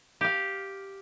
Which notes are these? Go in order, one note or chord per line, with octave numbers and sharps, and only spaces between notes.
G4 F5